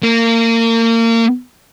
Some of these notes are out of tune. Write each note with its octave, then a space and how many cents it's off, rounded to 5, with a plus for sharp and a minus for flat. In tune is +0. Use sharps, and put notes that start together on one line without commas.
A#3 -30